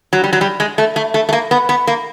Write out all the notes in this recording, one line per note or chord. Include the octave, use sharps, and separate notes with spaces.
F#3
G3
F#3
G3
G#3
A3
A3
A3
A3
A#3
B3
B3
A#3